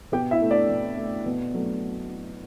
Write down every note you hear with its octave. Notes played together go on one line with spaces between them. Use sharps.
B2 G4 G5
E4 E5
A3
D4 D5
B2
A3
B2
F#3 A3